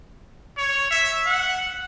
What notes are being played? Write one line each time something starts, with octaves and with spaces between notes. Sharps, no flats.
C#5
E5
F#5